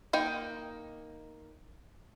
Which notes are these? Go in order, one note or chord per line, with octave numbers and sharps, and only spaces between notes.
A#3 D#4 G5